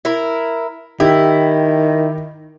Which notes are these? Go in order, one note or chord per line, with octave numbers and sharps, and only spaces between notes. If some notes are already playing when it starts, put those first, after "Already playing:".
E4 A#4
D#3 E4 G4